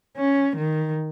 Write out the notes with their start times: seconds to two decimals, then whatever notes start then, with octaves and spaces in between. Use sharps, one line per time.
0.17 C#4
0.57 D#3